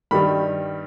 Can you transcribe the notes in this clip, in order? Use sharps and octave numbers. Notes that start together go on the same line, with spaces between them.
G2 D#3 G3 B5